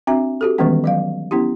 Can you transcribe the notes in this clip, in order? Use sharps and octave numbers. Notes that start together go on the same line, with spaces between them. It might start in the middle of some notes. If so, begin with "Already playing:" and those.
C4 D4 F#4 E5 A#5
F#4 G4 A4
D#3 E3 G3 G#3 B3 C#4
F#3 D#5 F5
B3 C#4 E4 G4